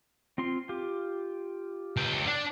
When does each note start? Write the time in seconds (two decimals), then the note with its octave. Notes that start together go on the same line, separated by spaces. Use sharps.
0.38 C4 F4 C6
0.69 F4 G4
1.97 C#2 G5
2.26 D4